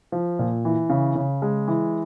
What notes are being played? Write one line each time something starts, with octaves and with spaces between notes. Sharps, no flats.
F3
A#2
E3
C#3
C#3
G#3
E3